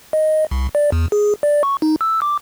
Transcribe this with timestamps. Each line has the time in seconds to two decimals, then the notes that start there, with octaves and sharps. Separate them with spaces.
0.13 D#5
0.51 C2
0.75 D5
0.92 E2
1.12 G#4
1.43 D5
1.63 C#6
1.82 D#4
2.01 E6
2.22 D6